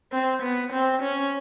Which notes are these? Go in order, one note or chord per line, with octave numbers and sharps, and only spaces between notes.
C4
B3
C4
C#4